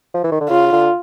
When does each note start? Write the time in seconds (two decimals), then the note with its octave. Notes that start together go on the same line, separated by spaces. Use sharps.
0.14 F3
0.24 E3
0.32 D#3
0.41 D3
0.49 C#3 F4
0.72 D3